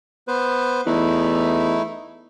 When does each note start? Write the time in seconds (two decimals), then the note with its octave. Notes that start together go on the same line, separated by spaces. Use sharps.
0.28 B3 B4 C5
0.86 E2 A3 D#4 E4